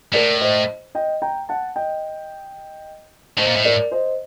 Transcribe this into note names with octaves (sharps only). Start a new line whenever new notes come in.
A2 A#4 D5
C5 D#5
D#5 G5
G5 A#5
F#5 A5
D#5 G5
A2 C5 D#5
A#2
A2
A#4 D5
C5 D#5